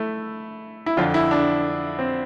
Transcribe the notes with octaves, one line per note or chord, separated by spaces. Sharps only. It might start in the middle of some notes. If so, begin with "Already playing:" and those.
Already playing: A3 E4
E4
F2 D3 F4
E4
D4
C4